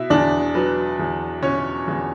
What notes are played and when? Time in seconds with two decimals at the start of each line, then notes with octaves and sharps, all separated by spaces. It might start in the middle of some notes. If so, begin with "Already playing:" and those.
Already playing: B2 E4 E5
0.10 E2 D4 D5
0.55 F#3 B4
0.99 E2
1.43 B2 C#4 C#5
1.88 E2